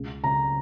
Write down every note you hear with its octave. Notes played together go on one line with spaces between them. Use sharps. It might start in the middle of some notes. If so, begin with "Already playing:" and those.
Already playing: C#2
C#3 A#5